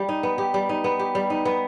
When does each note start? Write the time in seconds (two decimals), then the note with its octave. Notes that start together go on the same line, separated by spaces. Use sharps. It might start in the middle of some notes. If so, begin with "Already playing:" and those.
Already playing: G3 G4
0.09 D#4
0.23 B3
0.38 G4
0.54 G3
0.69 D#4
0.84 B3
0.99 G4
1.15 G3
1.30 D#4
1.45 B3